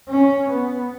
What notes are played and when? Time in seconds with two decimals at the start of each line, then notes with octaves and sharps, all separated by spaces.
0.09 C#4
0.50 B3